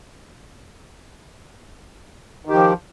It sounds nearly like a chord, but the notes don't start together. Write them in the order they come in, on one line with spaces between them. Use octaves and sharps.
D#3 G4 F3